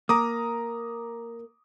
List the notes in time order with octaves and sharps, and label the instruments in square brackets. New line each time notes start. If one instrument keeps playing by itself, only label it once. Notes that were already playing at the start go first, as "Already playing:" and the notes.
[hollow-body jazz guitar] A#3 [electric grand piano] A#5 D6 D#6